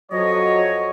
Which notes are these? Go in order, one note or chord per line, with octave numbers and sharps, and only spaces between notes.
F2 F#3 C#5 D#5